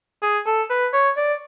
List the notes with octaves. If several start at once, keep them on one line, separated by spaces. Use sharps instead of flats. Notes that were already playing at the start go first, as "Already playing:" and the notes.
G#4
A4
B4
C#5
D5